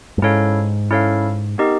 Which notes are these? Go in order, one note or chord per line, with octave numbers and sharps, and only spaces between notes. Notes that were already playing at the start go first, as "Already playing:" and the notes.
G2
G#2 C#4 E4 A4 C#5 F5
C#4 E4 A4 C#5 F5
B3 D#4 G4 A#4 D#5